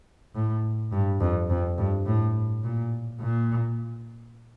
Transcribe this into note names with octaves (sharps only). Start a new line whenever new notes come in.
A2
G2
F2
F2
G2
A2
A#2
A#2